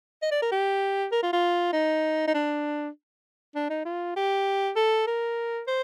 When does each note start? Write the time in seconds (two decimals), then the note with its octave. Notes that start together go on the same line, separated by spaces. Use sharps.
0.22 D#5
0.31 D5
0.42 A#4
0.51 G4
1.12 A#4
1.23 F4
1.33 F4
1.73 D#4
2.28 D#4
2.34 D4
3.55 D4
3.70 D#4
3.85 F4
4.16 G4
4.76 A4
5.07 A#4
5.67 C5